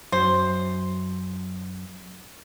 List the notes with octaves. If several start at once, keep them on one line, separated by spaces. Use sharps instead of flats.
F#2 C5